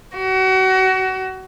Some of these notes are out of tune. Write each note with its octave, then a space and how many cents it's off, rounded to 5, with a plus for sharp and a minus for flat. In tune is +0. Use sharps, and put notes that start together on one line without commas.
F#4 +30